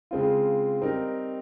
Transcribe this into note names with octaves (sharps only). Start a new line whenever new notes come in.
C#3 G#3 C4 F4
G3 C4 D#4 A#4